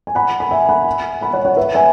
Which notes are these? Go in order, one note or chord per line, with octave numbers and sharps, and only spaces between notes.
G#5
F#5 B5
B5
E5 G#5
F#5 B5
F#5 B5
C#5 F#5
C#5 F#5
B4 E5
E5 G#5